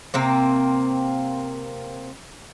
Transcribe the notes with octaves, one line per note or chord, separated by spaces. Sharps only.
C3 A#3 C4